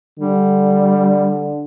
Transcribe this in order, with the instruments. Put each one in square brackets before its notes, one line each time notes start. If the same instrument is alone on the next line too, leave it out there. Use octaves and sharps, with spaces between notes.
[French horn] D3 [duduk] G3